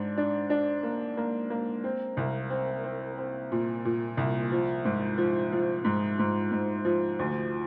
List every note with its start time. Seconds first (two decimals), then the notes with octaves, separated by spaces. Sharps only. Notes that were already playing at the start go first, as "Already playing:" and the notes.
Already playing: G#2 D4
0.18 D4
0.50 D4
0.83 A#3
1.17 A#3
1.50 A#3
1.84 C4
2.17 C2
2.50 C4
2.84 C4
3.18 C4
3.52 A#2
3.85 A#2
4.17 C2
4.52 F3
4.85 G#2
5.18 F3
5.52 F3
5.84 G#2
6.19 G#2
6.52 G#2
6.85 F3
7.19 D2